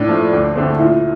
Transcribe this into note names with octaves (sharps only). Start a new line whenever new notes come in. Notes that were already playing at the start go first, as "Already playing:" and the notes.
Already playing: A2 D4
F3 A3
D2
D3 A3 C4
A#2 E4